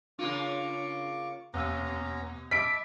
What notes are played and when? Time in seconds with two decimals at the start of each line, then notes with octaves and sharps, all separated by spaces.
0.19 C#3 A#3 D4 F4 C#6 D6
1.54 E2 B2 A#3 B3 C#4 A#5 E6
2.51 D#5 E5 A5 B5 D6 B6 D7